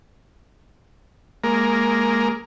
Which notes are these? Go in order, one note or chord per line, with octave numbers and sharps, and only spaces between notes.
G#3 A#3 A#4